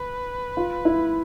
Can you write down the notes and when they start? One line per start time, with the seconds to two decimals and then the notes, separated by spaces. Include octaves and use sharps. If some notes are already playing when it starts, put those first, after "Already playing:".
Already playing: B4
0.57 F4
0.85 E4